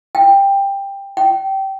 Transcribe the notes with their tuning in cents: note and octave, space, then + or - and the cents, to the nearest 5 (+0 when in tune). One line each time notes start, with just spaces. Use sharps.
G5 +15
G5 -20